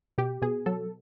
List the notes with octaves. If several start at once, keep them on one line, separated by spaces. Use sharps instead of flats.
B2 G4
B2 G#4
F#3 A4